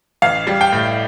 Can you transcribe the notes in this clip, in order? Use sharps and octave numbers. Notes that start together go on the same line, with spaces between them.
A1 F5
G3
G5
A2